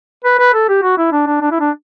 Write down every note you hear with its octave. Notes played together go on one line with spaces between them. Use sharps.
B4
B4
A4
G4
F#4
E4
D4
D4
D4
E4
D4